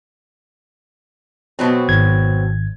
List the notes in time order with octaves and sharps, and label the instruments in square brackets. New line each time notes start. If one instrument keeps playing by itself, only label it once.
[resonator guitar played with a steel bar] B2 F#3 C4
[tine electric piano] G#1 G#6